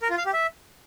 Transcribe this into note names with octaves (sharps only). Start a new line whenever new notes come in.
A#4
F4
F5
G4
E5